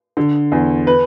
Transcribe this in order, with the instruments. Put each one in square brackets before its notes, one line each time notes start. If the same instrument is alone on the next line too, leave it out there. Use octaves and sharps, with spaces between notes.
[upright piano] D3
E2
B4